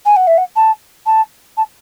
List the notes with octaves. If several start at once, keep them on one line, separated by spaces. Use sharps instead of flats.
G#5
F#5
E5
F#5
A5
A5
A5